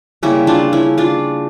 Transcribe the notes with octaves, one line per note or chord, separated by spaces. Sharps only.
C#3 G3 A#3 C#4 E4
D4 F4
C#4 E4
D4 F4